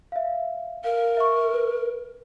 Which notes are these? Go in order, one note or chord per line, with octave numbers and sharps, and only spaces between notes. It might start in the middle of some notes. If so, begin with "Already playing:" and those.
E5 F5
A#4 F5
E5 C#6
B4